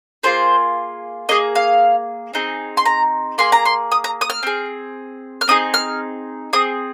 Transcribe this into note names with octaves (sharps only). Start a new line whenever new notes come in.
A#3 F4 G#4 C5
A#3 G#4 D#5
F5
C4 D#4 G#4
C6
A#5
A#3 G#4 C6
A#5
C6
D#6
A#5
D#6
F6
C4 G#4
F6
C4 D#4 G#4 D#6
F6
C4 G#4 D#6